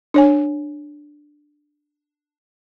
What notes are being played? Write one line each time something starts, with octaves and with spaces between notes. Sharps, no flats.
D4 C#5 G#5